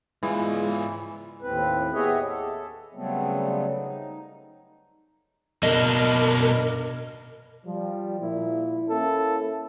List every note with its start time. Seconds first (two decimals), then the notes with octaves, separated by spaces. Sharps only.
0.23 G#2 E3 G#3 F4
1.41 D#2 A2 C4 B4
1.94 B3 G4 G#4 C#5 D#5 E5
2.26 A4
2.94 C#3 F#3 G3 A3 B3 C4
3.76 D#4
5.63 B2 D4 A#4 D#5
7.65 F3 G3
8.20 A#2 E4
8.88 A#3 C#4 E4 A4